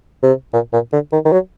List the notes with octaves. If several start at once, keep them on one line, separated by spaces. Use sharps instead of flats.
C3
A#2
A#2
D3
D#3
D#3
F#3